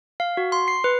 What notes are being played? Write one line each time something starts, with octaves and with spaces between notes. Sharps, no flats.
F5
F#4
C6
C7
B4